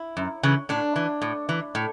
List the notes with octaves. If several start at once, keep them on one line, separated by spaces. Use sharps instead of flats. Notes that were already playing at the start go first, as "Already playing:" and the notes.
Already playing: E4
F#2
C#3 E3
A2 D4
E3
A2
E3
A2